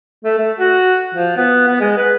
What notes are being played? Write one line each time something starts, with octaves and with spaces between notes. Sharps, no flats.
A3
A3
F#4
F3
B3
B3
G#3
B4